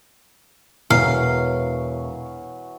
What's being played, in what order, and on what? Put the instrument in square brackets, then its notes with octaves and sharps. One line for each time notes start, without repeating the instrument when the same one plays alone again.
[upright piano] E1 [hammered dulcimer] E3 F#3 C#5 [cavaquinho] F5